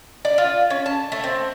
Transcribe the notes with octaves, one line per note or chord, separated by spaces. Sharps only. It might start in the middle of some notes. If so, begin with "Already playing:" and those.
D5
F4
C#4
A5
A3
C4